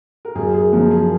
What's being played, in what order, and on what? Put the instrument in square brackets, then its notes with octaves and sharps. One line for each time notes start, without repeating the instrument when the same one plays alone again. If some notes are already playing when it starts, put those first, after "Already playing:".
[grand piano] A#4
F#2 G#4
G#4
C#3 F3 A#4
G#4